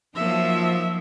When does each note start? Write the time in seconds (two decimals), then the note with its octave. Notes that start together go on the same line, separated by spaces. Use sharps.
0.15 F3 F#3 A#3 D#4 E5